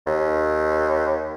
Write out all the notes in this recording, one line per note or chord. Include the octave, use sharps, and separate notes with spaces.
D#2